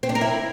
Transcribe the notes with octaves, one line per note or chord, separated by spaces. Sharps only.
C4
D4
A#4
E4